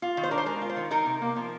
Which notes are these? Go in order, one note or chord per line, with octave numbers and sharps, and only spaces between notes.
F4
D#3
C5
D4 A#4
C5
G#3 A#4
F4
C5
D#3
D#4 A#4
C3
A#3
F3